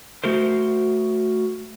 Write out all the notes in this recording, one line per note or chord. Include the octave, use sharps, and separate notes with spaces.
A3 F#4 A#4 C5